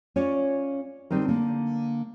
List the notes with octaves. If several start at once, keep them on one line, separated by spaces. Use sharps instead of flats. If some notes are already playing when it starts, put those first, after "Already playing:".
C#4 F4 C#5 D5
D3 G3 C4 D#4 A#4
D3 A#3